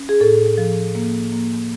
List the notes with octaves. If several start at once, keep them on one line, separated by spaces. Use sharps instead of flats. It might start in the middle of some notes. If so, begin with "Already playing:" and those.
Already playing: C#4
G#4
A2 A4
F3
A#3
A#3